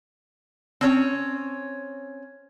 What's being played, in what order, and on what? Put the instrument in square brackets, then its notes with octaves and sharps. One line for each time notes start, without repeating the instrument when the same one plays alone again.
[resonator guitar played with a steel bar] C4 C#4 C#5